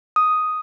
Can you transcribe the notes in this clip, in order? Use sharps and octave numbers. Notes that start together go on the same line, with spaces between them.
D#6